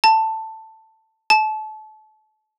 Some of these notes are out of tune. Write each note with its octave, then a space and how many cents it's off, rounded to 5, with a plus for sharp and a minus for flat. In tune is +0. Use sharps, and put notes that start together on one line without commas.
A5 +10
A5 -30